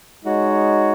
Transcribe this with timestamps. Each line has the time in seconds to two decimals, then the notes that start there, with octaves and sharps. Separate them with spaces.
0.24 G#3 D#4 F#4 C#5